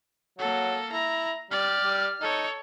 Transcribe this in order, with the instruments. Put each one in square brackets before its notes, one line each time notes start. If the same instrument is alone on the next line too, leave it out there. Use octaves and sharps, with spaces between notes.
[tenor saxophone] F#3 [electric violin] A#3 A4
[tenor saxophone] E4 [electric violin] A#5
[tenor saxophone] G3 [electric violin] G4 D5 [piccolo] F6
[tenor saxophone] G3
[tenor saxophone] D#4 [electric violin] A4 C#5